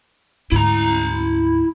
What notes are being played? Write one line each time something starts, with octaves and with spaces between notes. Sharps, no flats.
D2 G#2 E4 A#5